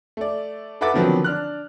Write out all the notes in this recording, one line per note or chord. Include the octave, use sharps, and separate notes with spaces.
A3 D5
A4 B4 E5 F#5 D6 A6
D3 D#3 F3 F#3 B3 C4
D4 F6 F#6